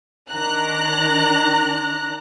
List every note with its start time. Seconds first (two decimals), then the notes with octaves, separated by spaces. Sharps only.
0.30 D#3 D4 A#5 F#6